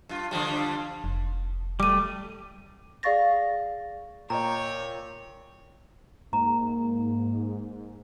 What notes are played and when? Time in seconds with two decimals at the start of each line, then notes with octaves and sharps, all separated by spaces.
0.09 G2 F4
0.31 D3 F3 G3
1.04 F1
1.80 G3 A3 D6 D#7
3.03 G#4 D5 F5 C#6 A6 A#6
4.30 A#2 C#5 D#5 G5 A#5
6.33 G#2 A#3 A#5